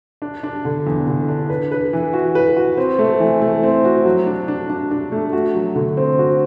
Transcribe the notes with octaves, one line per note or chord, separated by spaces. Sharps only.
D4
D4
D3
E2
D3
D4
B4
B4
E3
F#4
B4
F#4
C4
A3
E3
A3
C4
F#4
F#3
D4
D4
D4
D4
A3
F#4
F#3
D3
C4
F#4